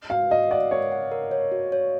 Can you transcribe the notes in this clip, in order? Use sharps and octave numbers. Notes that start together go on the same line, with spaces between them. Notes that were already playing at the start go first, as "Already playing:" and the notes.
F#4 F5
F#4 D#5
D5 F#5
A#4 C#5
F#5
A#4
C#5
F#4
C#5